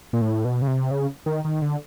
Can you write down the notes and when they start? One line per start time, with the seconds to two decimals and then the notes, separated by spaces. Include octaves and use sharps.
0.13 A#2
0.21 A2
0.45 B2
0.62 C#3
0.68 C3
0.91 C#3
1.26 D#3
1.45 D#3
1.62 D3